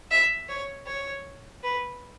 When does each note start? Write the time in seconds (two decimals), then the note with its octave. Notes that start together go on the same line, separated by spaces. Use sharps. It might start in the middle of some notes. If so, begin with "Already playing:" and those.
0.11 E5
0.49 C#5
0.86 C#5
1.63 B4